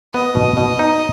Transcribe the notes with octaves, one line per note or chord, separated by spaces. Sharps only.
B3 D#5
B2
B2
D#4